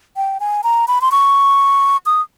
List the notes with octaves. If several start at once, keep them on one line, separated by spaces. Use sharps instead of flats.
G5
G#5
A#5
B5
C6
C#6
D#6